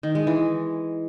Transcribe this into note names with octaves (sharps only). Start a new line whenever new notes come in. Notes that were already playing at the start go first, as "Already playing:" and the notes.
D#3
G#3
E3